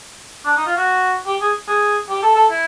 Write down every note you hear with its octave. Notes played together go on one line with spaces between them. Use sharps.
D4
D#4
F4
F#4
G4
G#4
G#4
G4
A4
A4
E4